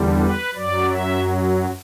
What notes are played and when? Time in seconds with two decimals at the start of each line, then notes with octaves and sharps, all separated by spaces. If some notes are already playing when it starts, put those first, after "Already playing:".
Already playing: E2 D3 G3
0.19 B4
0.54 F#2 F#3 D5
0.89 E5